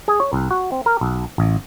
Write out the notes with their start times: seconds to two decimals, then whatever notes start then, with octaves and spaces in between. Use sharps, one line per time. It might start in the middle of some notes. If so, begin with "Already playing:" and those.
0.08 G#4
0.20 C#5
0.33 C2
0.51 F#4
0.72 C4
0.86 A#4
1.01 B1
1.38 A1